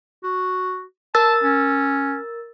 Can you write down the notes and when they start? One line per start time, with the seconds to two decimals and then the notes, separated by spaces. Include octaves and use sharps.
0.24 F#4
1.15 A#4 A5 E6 A6
1.43 C#4